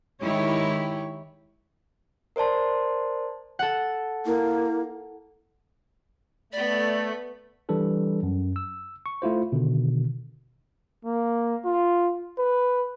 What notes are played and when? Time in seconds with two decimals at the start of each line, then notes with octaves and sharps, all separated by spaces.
0.22 D#3 G#3 E4 G4 C#5
2.36 A#4 C5 D5 A5 C6
3.59 A4 F#5
4.26 A#3 E4
6.53 A3 B3 D5 B5
7.69 E3 G3 D4 A4 B4
8.23 F#2
8.56 E6
9.06 C#6
9.22 A3 E4 F4 C5
9.52 B2 D3 D#3
11.05 A#3
11.65 F4
12.39 B4